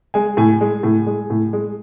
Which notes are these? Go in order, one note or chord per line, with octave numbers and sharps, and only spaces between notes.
G#3 G#5
A2 G#5
G#3
A2
G#3
A2
G#3